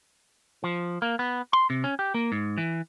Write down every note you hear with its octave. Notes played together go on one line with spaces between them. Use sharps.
F3
A#3
B3
C6
C3
C#4
G4
A#3
G#2
E3